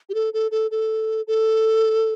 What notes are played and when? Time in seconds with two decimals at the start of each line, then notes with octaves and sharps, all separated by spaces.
0.09 G4
0.14 A4
0.33 A4
0.51 A4
0.71 A4
1.27 A4